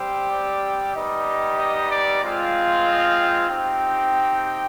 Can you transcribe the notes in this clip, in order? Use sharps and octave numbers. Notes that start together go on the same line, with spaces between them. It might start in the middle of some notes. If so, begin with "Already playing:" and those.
Already playing: G3 C4 G4 C5
D5
G3 B3 D#4 G4 D#5
D#5
D5
G#3 C4 F4
D#5
G5
C4 D#4 G4 G5